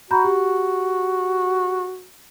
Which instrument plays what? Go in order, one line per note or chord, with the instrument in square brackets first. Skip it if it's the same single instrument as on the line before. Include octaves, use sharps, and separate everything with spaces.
[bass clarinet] F#4 [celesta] A#5 B5 G6
[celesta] G4